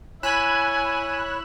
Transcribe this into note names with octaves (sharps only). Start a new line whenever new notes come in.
E4 C#5 G#5 B5 F#6 E7